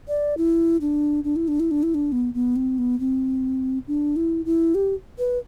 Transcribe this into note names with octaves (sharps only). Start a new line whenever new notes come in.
D5
E4
D4
D4
E4
D4
E4
D4
E4
D4
B3
B3
C4
B3
C4
D4
E4
E4
G4
B4